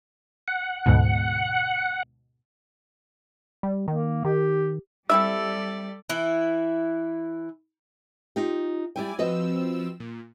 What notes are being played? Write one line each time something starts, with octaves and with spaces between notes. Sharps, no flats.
F#5
D2 G#2 B2
G3
D#3 A#3
D#3 G4
G3 C4 E4 A4 D5 E5 E6
E3 E4
D#4 F4 G4
G3 E4 D5 G5 G#5
F3 C4 F#4 B4 D#5 E6
A#2